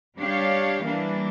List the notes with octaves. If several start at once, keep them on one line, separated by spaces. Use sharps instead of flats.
G3 D4 G4 C#5 F5
E3 G3 A#3 D4